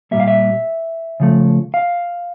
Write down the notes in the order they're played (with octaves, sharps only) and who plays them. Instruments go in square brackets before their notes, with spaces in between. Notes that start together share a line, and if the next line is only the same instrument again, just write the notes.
[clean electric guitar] A#2 G3 A#3 E5
F5
E5
C#3 F3 A3
F5